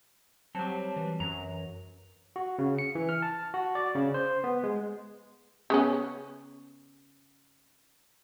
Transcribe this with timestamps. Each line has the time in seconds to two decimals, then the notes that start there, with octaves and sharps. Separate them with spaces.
0.55 F#3 G3 C4 A5
0.96 E3
1.20 F#2 A#5
2.36 F#4
2.59 C#3
2.78 C#7
2.95 E3
3.09 F6
3.22 A5
3.54 F#4
3.75 D5
3.95 C#3
4.14 C5
4.44 B3
4.64 G#3
5.70 C#3 B3 C#4